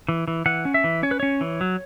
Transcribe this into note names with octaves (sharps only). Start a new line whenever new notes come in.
E3
E3
E3 F#5
C#4
E5
E3
C#4 C#5
B4
C#4 C#5
E3
F#3